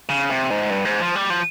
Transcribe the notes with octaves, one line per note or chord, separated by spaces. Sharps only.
C#3
C3
G#2
G2
G#2
F3
G3
F3